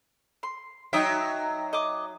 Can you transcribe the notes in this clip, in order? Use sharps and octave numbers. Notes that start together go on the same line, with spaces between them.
C6
F#3 D#4 E5 G5 D#6
D#5 D6